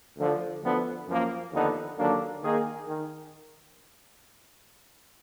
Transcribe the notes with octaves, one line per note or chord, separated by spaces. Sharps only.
D2 D3 F3
D2 D3 F3 B3
F#2 F3 A#3
D#2 D3 F3 B3 D#4
D#2 D3 F#3 A#3 D4
D#3 A#3 D#4 G#4
D#3